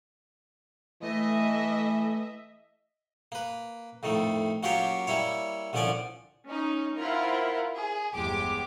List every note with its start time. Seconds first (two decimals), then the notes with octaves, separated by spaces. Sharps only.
1.03 E3 A3 D#5 E5
3.32 A#3 B4
4.03 F2 A2 D#3 A3
4.63 F#3 A#3 C#4 F4 G4 C#5
5.07 G3 A#3 E4 C#5
5.73 C2 D3 F3 C#4 D5 G#5
6.46 C#4 D#4
6.97 E4 F4 A#4 C5 F5 F#5
7.75 G#4
8.14 G1 E2 G#3 G4 D6